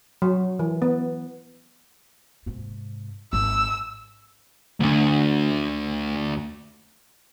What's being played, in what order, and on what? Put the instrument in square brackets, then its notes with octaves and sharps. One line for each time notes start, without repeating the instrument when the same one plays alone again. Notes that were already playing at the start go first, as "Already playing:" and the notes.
[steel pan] F#3
E3
B3
[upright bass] G#2 C3
[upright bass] G#1 [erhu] E6
[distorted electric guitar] D2 D3